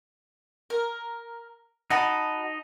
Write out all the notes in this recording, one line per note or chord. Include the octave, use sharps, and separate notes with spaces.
A#4
D#4 F#4 D#5 A5 B5